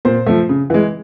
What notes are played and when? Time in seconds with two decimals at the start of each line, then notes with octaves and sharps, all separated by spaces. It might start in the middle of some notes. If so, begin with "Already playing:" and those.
0.05 A#2 C5
0.27 F3 A3
0.49 C#3
0.70 E3 G#3